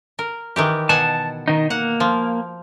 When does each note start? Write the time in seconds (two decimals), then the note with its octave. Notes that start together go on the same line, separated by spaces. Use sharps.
0.19 A#4
0.56 D#3 E3 G4
0.89 B2 F#5 G#5 A5
1.48 D#3 D#4
1.70 A#3 F#5
2.00 F3